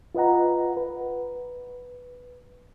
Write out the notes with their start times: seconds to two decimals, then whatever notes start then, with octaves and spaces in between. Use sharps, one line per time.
0.15 F4 B4 D#5 F#5 A#5
0.77 B4